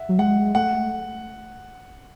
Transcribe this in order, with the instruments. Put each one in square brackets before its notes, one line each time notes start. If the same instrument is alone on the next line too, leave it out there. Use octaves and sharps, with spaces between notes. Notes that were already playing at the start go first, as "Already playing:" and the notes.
Already playing: [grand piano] E5 F#5
[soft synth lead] F#3
[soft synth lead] G#3 [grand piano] F#5
[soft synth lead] A3 [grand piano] F#5